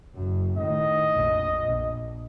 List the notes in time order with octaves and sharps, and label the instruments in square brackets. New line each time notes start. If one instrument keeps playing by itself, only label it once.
[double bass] F#1 F#2
[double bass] A2 D#3 [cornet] D#5
[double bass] A#1 F2
A#1